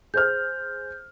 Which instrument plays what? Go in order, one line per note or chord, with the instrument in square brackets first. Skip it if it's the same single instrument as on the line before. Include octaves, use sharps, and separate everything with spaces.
[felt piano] G#4 C5 F6 [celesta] G6